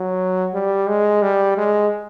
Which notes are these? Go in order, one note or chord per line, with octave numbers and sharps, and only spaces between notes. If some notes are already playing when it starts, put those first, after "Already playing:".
Already playing: F#3
G3
G#3
G3
G#3